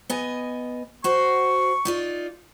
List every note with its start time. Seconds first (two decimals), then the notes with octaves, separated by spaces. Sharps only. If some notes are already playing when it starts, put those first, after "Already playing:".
0.10 B3 D#5 G#5
1.04 F#4 C5 C#6
1.85 D#4 F4 D5